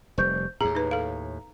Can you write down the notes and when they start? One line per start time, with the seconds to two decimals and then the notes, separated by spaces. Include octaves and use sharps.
0.18 F1 G3 C5 C#6 G6
0.61 D#2 A2 G#4 A#5
0.75 D#4 B4
0.91 A4 F5